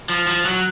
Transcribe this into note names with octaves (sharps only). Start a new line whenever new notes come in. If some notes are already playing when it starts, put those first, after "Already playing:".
F3
F3
F#3